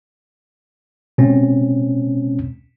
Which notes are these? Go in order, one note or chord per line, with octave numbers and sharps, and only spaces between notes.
B2 G#3 C4 C#4